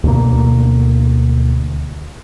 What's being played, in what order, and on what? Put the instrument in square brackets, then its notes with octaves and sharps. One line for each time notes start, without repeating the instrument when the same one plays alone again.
[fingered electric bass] D2 B2 D3 A#3